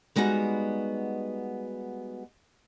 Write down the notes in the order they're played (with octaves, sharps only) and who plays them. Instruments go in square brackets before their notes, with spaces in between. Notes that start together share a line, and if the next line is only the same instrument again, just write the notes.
[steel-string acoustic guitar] G3 G#3 B3 D#4 F#4